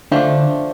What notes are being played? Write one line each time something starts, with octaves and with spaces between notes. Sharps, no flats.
D3 F3 A3 D4